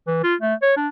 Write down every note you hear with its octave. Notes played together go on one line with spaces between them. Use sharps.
E3
F4
A3
C#5
D4